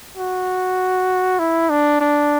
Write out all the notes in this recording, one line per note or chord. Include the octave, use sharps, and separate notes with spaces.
F#4
E4
D4
D4